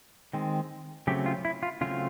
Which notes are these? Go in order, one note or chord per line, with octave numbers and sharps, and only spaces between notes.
D#3 G#3 C4
C#3 F#3 A3 C4 G4
F4
E4
F4
C#3 F#3 A3 C4 F4